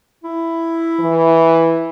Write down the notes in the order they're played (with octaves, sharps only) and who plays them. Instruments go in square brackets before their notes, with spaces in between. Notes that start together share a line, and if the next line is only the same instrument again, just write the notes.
[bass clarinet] E4
[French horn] E3